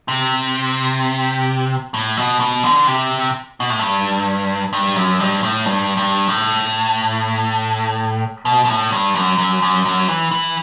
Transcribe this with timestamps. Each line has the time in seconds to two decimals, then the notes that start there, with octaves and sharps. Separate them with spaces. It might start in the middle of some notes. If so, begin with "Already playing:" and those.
0.08 C3
1.94 A2
2.17 B2
2.40 B2
2.63 D3
2.87 C3
3.60 B2
3.70 A2
3.79 G2
4.73 G2
4.96 F#2
5.20 G2
5.43 A2
5.66 G2
5.97 G2
6.28 A2
8.45 B2
8.65 B2
8.69 A2
8.92 G2
9.15 F#2
9.38 F#2
9.62 F#2
9.85 F#2
10.08 E3
10.31 E3